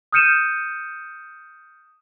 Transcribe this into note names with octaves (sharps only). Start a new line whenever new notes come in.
D#6 F6 G6 C#7 D#7 E7